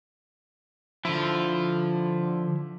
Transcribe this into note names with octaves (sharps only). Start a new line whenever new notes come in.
D3 F3 E4